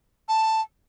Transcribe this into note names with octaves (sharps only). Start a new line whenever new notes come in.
A5